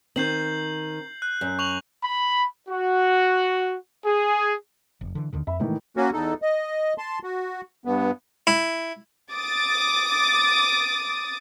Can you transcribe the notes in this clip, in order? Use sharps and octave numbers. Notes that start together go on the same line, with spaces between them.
D#3 C4 G6 C7 F#7
F#6
F#2
C#6 F7 F#7
B5
F#4
G#4
F1
D3 E3
D#2 D3 D#3
F2 E5 B5
A2 D#3 E3 G#3 A#3
A#3 C#4 F#4
E2 D#4 A4
D#5
A5 C6
F#4
G2 B3
E4
D6 D#6 A6